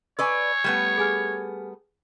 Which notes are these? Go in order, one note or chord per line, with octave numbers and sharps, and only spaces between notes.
B4 C#5 D5 G#5 C#6 E6
G3 A3 B3
G#4 G#5 F6